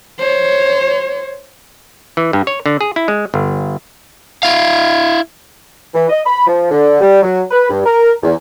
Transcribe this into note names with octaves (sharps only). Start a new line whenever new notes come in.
C5 C#5
E3
G2
C#5
D3
G#4
E4
G#3
G1
E4 F5
E3
D#5
B5
F3
D3
G3
F#3
B4
G2
A#4
E2